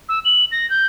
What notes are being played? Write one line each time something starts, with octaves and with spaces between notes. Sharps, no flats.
E6
F#7
A#6
G6